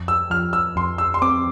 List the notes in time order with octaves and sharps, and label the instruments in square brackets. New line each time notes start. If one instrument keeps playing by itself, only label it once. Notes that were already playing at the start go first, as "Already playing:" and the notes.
Already playing: [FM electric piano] F2
[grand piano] E6
[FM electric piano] F3 [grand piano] F6
[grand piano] E6
[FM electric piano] F2 [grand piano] C6
[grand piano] E6
C6
[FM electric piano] C4 [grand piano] D6